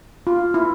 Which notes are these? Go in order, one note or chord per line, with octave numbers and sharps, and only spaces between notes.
F4
E4